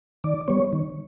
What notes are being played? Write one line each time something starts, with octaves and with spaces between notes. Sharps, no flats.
D#3 D5
G3 B3 C#5
D#3